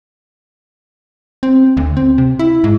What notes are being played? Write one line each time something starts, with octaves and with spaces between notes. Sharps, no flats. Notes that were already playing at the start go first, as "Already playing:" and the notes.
C4
D2
C4
C3
E4
G#2